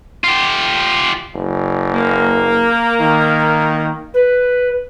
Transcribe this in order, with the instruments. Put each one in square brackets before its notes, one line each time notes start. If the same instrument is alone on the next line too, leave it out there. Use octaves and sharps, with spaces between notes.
[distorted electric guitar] F4 G4
[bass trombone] F#1
[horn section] A#3
[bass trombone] D#3
[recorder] B4